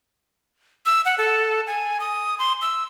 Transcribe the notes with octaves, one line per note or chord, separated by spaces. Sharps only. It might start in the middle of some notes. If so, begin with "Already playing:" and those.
E6
F#5
A4
G#5
D#6
C6
E6